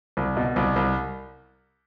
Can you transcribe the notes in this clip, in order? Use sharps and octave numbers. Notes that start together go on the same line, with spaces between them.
C2
B2
C2
C2